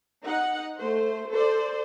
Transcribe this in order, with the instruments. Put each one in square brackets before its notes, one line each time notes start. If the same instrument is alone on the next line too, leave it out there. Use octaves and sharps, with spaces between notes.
[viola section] D#4 F#5
A3 C5
A4 C5 D5